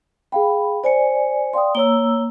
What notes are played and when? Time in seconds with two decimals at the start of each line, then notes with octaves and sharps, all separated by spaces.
0.32 G#4 F5 G5 B5
0.84 C5 D5 G#5 C#7
1.53 D5 F5 G5 C6 D#6
1.75 A#3 C#5 A#5 E6 G7